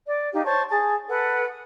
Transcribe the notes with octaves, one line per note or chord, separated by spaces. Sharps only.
D5
D#4 G4 F5
C5 C#5 A5 C#6
G#4 A5
A4 B4 F#5
D#6